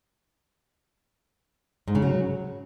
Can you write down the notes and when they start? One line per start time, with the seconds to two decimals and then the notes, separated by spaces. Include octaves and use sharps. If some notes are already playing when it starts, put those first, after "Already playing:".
1.88 G#2
1.95 C#3
2.02 F#3